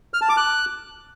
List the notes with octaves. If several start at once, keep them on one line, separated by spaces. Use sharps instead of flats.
F6
A5
D6
F#6